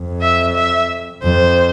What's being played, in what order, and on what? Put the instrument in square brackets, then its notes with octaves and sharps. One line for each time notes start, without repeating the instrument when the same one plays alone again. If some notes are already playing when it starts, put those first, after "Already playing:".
Already playing: [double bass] F2
[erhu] E5
E5
[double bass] F2 [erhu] C5